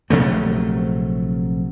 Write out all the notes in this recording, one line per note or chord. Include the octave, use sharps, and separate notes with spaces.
A#1 C3 F#3 A3